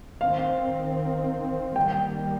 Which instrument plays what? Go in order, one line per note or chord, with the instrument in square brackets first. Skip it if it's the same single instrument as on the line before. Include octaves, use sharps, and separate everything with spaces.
[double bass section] D#3 C4 [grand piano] F5
[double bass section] D#3 G3 A#3 [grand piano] G5